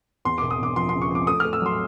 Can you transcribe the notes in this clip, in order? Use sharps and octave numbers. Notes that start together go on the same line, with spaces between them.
E2 C6
E1 D6
D#6
E1 D6
F3 C6
C#3 C6
C#6
F3
D6
A3 D#6
A3 F6
E6
F#3 C6